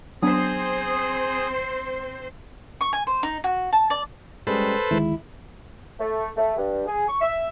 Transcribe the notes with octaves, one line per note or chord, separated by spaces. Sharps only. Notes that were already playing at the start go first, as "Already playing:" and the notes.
F#3 B3 C4 D4 G#4 C5 D#6
C#6
G#5
C5
D#4
F#4
A5
D5
G3 G#3 C#4 A4 B4 C5
D2 D#3 G#3 E4
A3
A3
G2
G#4
C#6
E5